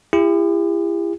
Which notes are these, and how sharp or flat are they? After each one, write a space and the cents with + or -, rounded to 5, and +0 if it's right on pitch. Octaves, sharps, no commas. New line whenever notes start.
E4 +35 G4 +45